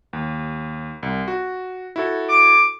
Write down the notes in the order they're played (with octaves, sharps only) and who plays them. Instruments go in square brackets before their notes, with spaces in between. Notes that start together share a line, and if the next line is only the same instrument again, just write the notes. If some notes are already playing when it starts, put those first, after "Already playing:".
[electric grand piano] D#2
C2
F#4
E4 F#4 A4
[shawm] D6